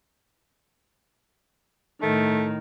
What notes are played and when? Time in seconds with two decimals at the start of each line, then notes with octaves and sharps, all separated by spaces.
2.02 A2 D#3 A3